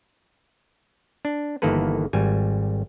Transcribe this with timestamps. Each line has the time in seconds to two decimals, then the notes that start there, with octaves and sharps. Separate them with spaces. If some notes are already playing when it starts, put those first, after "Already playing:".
1.25 D4
1.62 G1 D#3 E3 A#3 A4 B4
2.13 G#1 G3 G#5